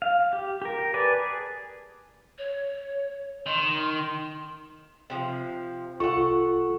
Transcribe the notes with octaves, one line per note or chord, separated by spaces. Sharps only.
F5
G4
G4 A#4
B4 D5 G#5 A5
G#4
C#5
D#3 C6
C3 F3
C2 F4 A4 F#5 C#6